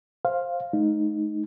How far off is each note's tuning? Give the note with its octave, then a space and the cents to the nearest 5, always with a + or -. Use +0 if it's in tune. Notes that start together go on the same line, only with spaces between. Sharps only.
C5 +15 F5 +0
A3 -45 D#4 +0